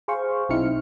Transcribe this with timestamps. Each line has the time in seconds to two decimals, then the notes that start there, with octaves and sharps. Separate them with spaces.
0.08 G#4 C5 F5 C#6
0.49 B1 C4 D#4 E4 F6 C#7